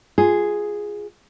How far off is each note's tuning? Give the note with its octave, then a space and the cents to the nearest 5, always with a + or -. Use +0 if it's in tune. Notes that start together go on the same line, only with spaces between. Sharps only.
F4 +0 G#4 +0